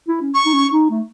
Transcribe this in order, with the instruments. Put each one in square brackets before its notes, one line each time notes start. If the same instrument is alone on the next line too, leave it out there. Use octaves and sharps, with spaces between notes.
[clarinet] E4
C#4
[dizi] C#6
[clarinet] D#4
C#4
D#4
A3